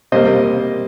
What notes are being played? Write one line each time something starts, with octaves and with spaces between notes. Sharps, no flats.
C3 G3 A#3 C5 D#5